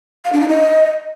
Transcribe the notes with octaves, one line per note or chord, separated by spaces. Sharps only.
F5
D4
D#4
D#5